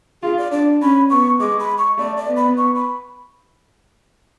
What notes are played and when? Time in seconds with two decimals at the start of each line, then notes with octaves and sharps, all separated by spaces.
0.22 F4 G#4
0.38 D5
0.52 D4 D5
0.81 C#4 B5
1.10 B3 C#6
1.40 G#3 D6
1.60 B5
1.78 C#6
1.98 A3 D5
2.17 D5
2.27 B3
2.37 B5
2.57 C#6
2.75 B5